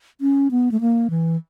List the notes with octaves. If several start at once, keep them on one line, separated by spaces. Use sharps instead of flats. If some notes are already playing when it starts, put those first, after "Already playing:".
C#4
B3
A3
A#3
E3